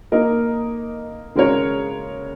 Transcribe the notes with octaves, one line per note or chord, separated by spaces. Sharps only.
A#3 D#4 A#4 D#5
C#3 G#3 F#4 A#4 C#5